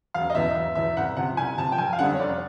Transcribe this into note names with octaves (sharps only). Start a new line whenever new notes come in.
E1 F5
D#5
E2 B2 E5
E1 E5
E2 B2 E5
C2 F#5
C3 F3 F#5
C2 G#5
C3 F3 A5
G5
F1 G#5
F5
F2 D3 G3 F#5
C#5
F1 D5